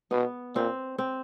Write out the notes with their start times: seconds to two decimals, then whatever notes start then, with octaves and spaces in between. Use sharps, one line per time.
0.11 B2 B3
0.55 A#2 C4
0.98 C4